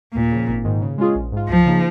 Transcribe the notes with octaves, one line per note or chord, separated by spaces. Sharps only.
D#2 A#2
C#3 F3
G#1
G#2 D#3
C#3
G#3 C#4 F4 G#4
A#1
G#2 G#3 F4
C#2 F3
C#3 A#3 D#4 G#4